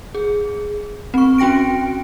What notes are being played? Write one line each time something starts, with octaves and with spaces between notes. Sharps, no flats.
G#4
C4 C#6
C#4 F#4 G5 A#6 D7